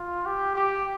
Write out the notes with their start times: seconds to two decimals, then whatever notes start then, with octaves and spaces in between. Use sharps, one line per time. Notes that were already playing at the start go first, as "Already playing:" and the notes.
Already playing: F4
0.26 G4
0.55 G4